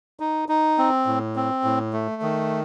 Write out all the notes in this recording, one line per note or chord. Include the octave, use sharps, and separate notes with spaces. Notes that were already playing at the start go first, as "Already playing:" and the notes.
D#4
D#4
C4
A2
C4
A2
A3
D#3